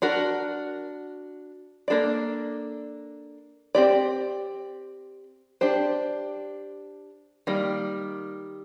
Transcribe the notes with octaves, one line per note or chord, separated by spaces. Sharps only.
D4 F#4 A#4
A#3 D4 A4 D5
C4 G4 D5
D4 G4 C5
D#3 G3 A#3